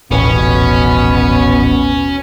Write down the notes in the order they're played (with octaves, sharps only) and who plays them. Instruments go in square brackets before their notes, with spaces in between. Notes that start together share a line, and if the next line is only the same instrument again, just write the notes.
[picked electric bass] D#1 A1 [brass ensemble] B2 [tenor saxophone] B3 [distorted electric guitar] C#4